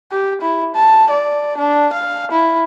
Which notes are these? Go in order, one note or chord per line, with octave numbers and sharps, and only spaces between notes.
G4
E4
A5
D5
D4
F5
E4